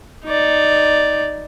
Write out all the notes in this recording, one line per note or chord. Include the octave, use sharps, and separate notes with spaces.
D#4 D5